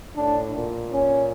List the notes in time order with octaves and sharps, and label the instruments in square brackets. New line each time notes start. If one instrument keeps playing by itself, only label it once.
[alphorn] A2 [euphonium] D4
[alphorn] A#2
[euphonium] C#4